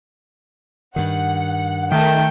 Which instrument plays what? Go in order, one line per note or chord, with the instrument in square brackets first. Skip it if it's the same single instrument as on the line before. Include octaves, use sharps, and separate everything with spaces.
[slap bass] G2 D#3 [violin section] F#5
[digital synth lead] D#3 [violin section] A3 D#4 [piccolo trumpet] G5